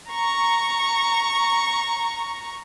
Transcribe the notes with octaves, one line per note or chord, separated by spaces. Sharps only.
A#5 C#6